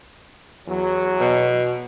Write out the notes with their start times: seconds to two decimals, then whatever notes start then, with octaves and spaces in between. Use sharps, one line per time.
0.68 E2 F#3
1.20 B2